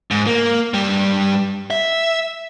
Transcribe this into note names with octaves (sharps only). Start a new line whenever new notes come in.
G#2
A#3
G2 G3
E5